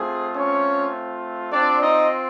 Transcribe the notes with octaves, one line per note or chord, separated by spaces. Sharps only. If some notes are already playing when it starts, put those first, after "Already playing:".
Already playing: A3 C4 F4 G#4
C#4 C#5
C4 D4 F4 D5
D#4 D#5